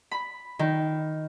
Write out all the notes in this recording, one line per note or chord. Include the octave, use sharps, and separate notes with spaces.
B5
D#3